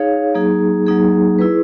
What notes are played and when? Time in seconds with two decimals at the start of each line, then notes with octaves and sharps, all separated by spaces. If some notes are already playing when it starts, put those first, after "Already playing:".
Already playing: D#4 G#4 C#5 F5
0.35 F#3 A#3 D#4 G#4
0.87 F#3 A#3 D#4 G#4
1.39 E4 G#4 B4